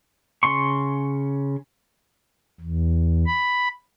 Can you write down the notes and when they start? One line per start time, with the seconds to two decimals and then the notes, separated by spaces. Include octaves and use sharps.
0.43 C#3 C6 C#6
2.61 E2
3.26 B5